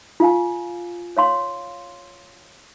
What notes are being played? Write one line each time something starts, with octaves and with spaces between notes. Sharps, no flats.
F4 F5 G#5
C#5 F5 C6